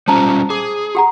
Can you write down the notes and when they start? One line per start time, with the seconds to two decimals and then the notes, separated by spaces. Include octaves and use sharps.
0.08 G3 C#4 F4 C5 A5 A#5
0.50 G#4 D6
0.95 G4 F#5 A#5